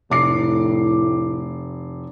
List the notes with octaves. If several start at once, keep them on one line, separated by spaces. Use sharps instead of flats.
F1 A2 D6 C7